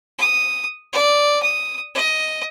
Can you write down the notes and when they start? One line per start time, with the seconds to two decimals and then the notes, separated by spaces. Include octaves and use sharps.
0.18 D#6
0.92 D5
1.42 D#6
1.95 D#5